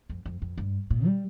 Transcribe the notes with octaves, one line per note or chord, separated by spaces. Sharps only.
F2
F2
F2
G2
A#2
G3